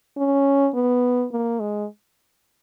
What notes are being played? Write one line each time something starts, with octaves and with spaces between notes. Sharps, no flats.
C#4
B3
A#3
G#3